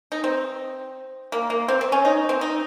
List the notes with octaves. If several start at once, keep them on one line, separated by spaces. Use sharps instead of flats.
D#4
C4
A#3
A#3
C4
C4
C#4
D#4
C4
D#4